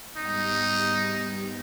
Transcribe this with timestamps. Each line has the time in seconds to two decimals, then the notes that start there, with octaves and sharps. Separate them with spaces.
0.17 G#2 G3 B3 D#4 G4